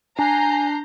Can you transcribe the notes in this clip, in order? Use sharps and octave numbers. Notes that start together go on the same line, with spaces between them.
D4 G#5 A#5 G6 C7